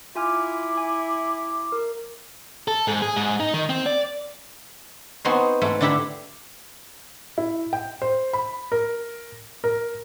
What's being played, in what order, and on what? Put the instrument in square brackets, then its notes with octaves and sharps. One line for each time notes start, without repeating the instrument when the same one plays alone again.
[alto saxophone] E4 [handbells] F4 G#5 F6 [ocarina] D6
[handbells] G#5
A#4
[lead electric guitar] A4
G#2
G#4
G#2
D#4
D#3
C4
D5
[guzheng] B3 C4 D#4 F#4 G#4 C5
G#2 A3
D3 D4 E4 G4 E5 B5
[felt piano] E4
G5
C5
B5
A#4
A#4